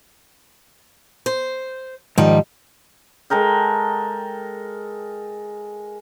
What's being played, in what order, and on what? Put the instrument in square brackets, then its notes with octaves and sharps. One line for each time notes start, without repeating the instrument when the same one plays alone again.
[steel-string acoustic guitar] C5
[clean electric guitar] G#2 D#3 F3 [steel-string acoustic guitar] G3 D#4
[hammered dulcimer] G#3 A4 A#4 G5